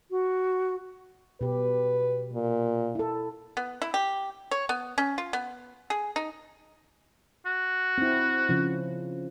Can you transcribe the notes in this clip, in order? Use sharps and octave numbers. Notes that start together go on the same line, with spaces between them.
F#4
B2 G4 B4
A#2
E4 A4
B3
E4
G4
C#5
B3
C#4
F4
B3
G#4
D#4
F#4
C4 E4
C#3 F3